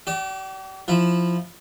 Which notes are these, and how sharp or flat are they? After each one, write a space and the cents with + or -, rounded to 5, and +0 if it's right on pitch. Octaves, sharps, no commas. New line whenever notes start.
G4 -45 D5 -10
F3 +0 E4 +0